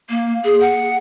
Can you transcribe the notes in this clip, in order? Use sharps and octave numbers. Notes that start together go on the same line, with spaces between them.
A#3
G#4
F#5